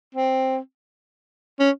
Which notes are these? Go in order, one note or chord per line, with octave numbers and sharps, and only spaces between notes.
C4
C#4